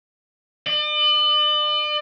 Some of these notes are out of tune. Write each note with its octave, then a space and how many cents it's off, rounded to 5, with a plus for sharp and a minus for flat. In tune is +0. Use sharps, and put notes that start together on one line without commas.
D5 +40